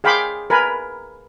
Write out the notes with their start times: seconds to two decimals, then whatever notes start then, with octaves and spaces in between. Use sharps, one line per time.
0.04 G#4 F5 G5 B5 C6 D6
0.50 A#4 B4 G#5 B5